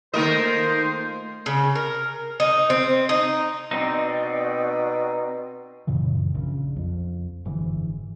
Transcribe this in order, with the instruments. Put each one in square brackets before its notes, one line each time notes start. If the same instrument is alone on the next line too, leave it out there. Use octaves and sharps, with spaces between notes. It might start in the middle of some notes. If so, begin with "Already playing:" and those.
[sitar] D#3 A#4 D#5 [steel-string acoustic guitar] A3 A#3 F4 [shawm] C5
[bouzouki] C#3
A#4
D#4
C4
D#4
[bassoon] B2 [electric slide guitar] C4 D#4 [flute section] D5 G5
[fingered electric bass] F#2 A#2 C#3 E3
A#1 C#3
F2
F#1 G#2 D3 E3